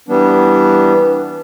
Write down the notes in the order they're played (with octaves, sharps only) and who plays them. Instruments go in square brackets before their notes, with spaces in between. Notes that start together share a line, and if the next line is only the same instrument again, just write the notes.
[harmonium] E3 G3 B3 D4